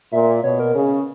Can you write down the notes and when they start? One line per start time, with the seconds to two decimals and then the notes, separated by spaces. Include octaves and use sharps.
0.12 A#2 E5
0.44 B2 C#5
0.59 A#4
0.75 C#3